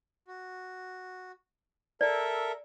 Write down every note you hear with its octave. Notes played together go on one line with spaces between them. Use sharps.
F#4
A4 A#4 D5 E5